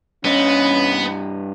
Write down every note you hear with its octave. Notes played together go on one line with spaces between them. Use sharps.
G2 B3 C#4 D#5